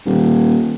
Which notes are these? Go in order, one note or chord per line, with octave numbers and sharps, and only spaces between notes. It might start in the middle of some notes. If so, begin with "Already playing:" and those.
D#1